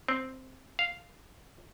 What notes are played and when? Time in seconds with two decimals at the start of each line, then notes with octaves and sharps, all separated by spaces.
0.08 C4
0.79 F5